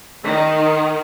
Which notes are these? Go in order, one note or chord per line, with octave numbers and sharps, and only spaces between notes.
D#3